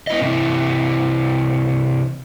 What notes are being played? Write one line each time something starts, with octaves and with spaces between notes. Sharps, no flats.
B3 E4 D#5
C3 E3 E4